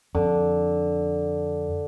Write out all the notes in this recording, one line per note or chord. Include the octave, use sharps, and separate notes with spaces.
F2 D3